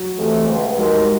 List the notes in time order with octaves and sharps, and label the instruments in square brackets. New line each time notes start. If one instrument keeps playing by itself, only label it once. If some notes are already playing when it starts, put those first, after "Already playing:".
Already playing: [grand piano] F#3
[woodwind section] F2 C3 E3 A3
C#2 B2 G#3
[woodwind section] D#2 D#3 G#3 [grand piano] F#3
[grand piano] G3